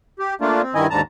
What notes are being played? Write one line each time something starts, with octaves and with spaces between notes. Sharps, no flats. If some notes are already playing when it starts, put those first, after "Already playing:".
G4
A3 A#3 D4 F4
C4
G2 D#3 E4 D#5 G#5
D#2 G#2 D3 A5 A#5